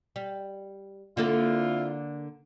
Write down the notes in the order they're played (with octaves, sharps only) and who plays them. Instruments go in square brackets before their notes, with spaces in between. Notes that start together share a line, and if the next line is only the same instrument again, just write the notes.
[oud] G3
[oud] D3 A#3 A4 [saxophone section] C4 E4 F4